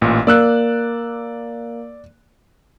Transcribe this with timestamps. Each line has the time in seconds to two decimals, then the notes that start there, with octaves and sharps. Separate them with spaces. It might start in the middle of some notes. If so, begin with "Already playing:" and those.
0.01 A1 A#2
0.27 A#3 D5 E6 F#6